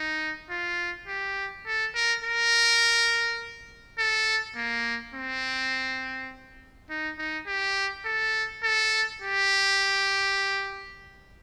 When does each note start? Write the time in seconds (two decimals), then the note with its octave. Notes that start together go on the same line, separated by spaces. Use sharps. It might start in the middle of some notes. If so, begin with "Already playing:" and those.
Already playing: D#4
0.50 F4
1.08 G4
1.66 A4
1.95 A#4
2.24 A#4
3.98 A4
4.56 A#3
5.15 C4
6.90 D#4
7.19 D#4
7.47 G4
8.05 A4
8.64 A4
9.22 G4